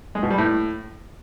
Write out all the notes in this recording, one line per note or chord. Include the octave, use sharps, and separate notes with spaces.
G#3
B2
G3
A2